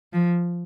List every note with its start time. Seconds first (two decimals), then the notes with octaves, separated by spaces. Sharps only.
0.13 F3